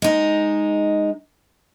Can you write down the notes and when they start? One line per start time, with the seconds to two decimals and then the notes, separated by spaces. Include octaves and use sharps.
0.02 G#3 D#4